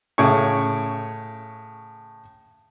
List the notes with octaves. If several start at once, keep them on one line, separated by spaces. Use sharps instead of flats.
A2 C#3 G#4 C#6